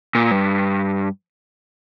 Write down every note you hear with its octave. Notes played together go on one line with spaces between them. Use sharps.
A#2
G2